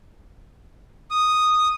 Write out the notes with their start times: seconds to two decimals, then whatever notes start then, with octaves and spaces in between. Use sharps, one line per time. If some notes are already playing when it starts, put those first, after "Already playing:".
1.11 D#6